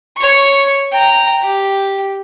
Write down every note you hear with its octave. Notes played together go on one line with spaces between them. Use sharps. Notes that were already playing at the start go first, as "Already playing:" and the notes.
C#5 C#6
G5 A#5
G4